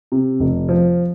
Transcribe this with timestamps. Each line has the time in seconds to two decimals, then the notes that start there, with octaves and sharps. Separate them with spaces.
0.12 C3
0.40 F1
0.69 F3